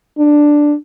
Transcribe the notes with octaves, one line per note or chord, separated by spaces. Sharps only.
D4